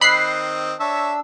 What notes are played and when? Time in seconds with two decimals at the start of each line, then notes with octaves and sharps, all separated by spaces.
0.01 D#3 C4 D#5 B5 F#6 C7
0.80 D4 C#5 E5 A5 E6